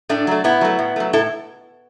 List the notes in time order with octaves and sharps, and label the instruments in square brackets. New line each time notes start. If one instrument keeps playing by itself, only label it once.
[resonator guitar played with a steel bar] A2 A3 D4
F#3 A3
A2 B3 E4
F#3 A3
A2
F#3 A3
A2 E4 A4